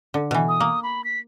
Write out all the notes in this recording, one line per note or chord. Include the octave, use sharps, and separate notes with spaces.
D3
B2 E3
D#6
A#3
B5
B6